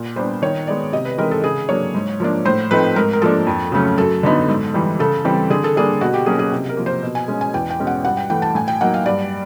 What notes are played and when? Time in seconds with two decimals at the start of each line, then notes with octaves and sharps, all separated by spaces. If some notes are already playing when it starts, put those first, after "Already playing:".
Already playing: A#2
0.16 G3 B3 D4 C5
0.42 D#3 C#5
0.67 G#3 B3 D#4 D5
0.93 C3 D#5
1.05 B4
1.18 E3 G#3 C4 D#4 A#4
1.31 A4
1.44 C#3 G#4
1.69 F#3 A#3 D4 C#5
1.94 G#2
2.20 F3 A#3 D4
2.45 A2 C5
2.71 F3 A3 C4 D#4 B4
2.96 G#2 A#4
3.13 A#4
3.22 F3 A#3 D4 A4
3.47 F2
3.72 C#3 F#3 A3 C#4
3.98 F#2 A4
4.23 D3 F#3 B3 D#4
4.49 G#2
4.74 E3 G3
4.99 C#3 A4
5.25 E3 G3 C4
5.50 D3 G#4
5.64 A4
5.76 G3 A#3 D4 G#4
6.01 B2 F#4
6.14 G4
6.26 F#3 A#3 C#4 G#4
6.39 G#4
6.52 C3
6.69 A#4
6.77 F3 A#3
6.86 C5
7.03 B2
7.15 G#5
7.28 G#3 C#4
7.41 G#5
7.54 E2 G5
7.70 G5
7.79 B2 G#3 C#4
7.87 F#5
8.05 G2 F#5
8.17 G5
8.30 E3 A3 G5
8.42 A5
8.55 A2 G#5
8.68 G5
8.81 F#3 A#3 D#4 F#5
8.94 F5
9.06 G2 D5